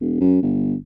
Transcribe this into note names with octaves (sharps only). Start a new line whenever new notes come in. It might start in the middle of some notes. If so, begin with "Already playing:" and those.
E1
F#2
G1